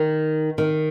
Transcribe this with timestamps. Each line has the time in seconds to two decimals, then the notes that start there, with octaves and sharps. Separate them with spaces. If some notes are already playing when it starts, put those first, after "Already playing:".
Already playing: D#3
0.58 D#3